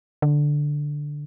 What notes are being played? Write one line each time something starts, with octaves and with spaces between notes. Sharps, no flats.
D3